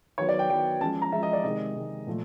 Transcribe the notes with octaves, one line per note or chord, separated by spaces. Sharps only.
D#3 F#3 B3 C#5
D5
G5
D#3 F#3 B3 G5
F3 G#3 C#4 A5
A#5
F3 G#3 C#4 E5
D#5
D5
C3 D#3 G#3 D#5
C3 D#3 G#3
A#2 F3 A3